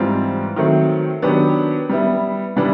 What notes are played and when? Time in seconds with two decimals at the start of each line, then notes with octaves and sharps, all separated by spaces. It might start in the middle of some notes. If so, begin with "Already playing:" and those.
Already playing: G#2 E3 G3 C4 F4
0.56 D#3 F#3 A3 C4
1.22 D#3 F#3 B3 D4 G4
1.90 G3 B3 E4
2.56 C#3 E3 G3 B3 D4